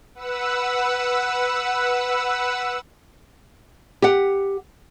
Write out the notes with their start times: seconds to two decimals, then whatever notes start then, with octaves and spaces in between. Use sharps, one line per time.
0.15 B4 F#5 E6
4.02 G4 F#5